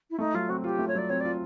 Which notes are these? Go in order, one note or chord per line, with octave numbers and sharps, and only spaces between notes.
E4
A3 D#4
F#3 F4
C4 F#4
F#4
F4 G4
A3
C#5
F#3 D5
C4 C#5
D5
F4